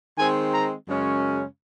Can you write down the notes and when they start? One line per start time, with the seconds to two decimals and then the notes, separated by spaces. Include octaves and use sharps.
0.16 D#3 G#3 C4 G#5
0.52 A#5
0.87 F#2 C#3 G#3 C#4